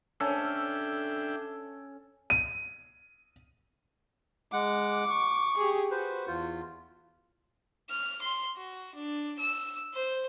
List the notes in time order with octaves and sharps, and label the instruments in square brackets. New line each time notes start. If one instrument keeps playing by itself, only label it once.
[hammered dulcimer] C#4 A4 [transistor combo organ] D4 E5 G5
[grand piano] D#7
[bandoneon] G#3 F#5 [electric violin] D6
[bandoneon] C#6
[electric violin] G4 G#4
[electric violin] F#4 [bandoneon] B4 C5
[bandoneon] E2 F4
[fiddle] F6
C6
F#4
D4
E6
C5